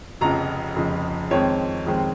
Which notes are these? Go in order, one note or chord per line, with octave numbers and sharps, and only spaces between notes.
F1 F2 C#3 A#5
F1 F2 C#3
F2 D#3 G#3 C4 C#5
F2 D#3 G#3 C4